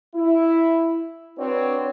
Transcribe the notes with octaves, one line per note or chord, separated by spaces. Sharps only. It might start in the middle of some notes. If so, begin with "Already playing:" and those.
E4
C4 D4 F#4 B4 C#5